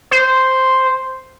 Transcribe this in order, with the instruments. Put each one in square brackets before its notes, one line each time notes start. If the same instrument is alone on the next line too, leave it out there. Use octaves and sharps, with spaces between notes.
[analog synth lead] C5